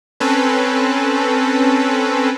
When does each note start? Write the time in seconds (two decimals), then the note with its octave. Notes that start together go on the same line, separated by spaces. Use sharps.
0.20 C4 C#4 A4 B4